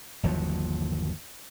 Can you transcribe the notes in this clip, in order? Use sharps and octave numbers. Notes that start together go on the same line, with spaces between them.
G1 D#2 F3 F#3